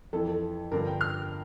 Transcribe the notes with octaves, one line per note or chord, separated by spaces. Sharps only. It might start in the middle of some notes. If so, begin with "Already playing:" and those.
F2 E3 A4
A4
G2 D3 F3 A#4
G5
F6